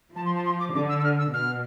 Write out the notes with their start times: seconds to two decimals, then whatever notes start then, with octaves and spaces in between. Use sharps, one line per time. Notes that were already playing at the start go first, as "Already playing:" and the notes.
0.16 F3 A5
0.25 C6
0.36 A5
0.45 C6
0.60 D6
0.75 D3 D6
0.89 E6
0.99 E6
1.04 F6
1.18 E6
1.32 B2 F6